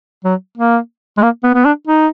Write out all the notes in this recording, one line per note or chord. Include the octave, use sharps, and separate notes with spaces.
F#3
A#3
G#3
A#3
B3
B3
D4
D#4